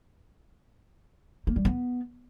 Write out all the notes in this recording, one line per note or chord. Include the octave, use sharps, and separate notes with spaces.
A#3
G3
B3